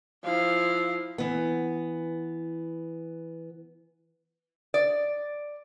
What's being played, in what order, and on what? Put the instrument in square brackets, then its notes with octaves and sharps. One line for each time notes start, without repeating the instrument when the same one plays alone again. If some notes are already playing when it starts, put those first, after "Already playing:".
[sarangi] F3 [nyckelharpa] E4 F5
[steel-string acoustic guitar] E3 B3
[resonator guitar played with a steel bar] D5